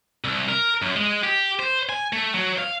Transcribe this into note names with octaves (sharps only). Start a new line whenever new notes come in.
C2
A#4
F#2
G#3
G4
C5
G#5
A3
F#3
F5